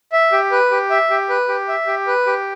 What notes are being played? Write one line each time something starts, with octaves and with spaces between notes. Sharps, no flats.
E5
G4
B4
G4
E5
G4
B4
G4
E5
G4
B4
G4